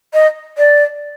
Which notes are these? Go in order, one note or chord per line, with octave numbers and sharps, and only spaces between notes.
D#5
D5